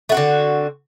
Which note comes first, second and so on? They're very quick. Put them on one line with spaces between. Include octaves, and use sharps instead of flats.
A3 F#4 C4 D3